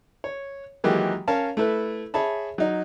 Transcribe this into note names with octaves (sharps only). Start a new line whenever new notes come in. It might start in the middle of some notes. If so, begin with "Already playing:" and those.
C#5
D#3 E3 F#3 G#3 A#3 G4
C#4 A#4 C#5 F5 A5
A3 E4 A4 B4
G#4 C#5 E5 A5 B5
F#3 D#4